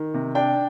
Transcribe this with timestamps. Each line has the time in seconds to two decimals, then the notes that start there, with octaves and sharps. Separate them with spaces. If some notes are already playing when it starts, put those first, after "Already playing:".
Already playing: D#3
0.14 C3
0.35 D4 G5